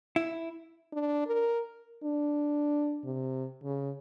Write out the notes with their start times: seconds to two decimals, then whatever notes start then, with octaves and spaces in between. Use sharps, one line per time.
0.16 E4
0.93 D4
1.27 A#4
2.04 D4
3.05 C3
3.64 C#3